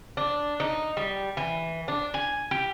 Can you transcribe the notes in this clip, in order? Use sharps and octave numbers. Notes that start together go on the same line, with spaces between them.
D4
D#4
G3
E3
D4
G#5
G4